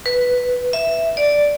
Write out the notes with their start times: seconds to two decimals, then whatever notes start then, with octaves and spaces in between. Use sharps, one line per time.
0.06 B4
0.73 E5
1.17 D5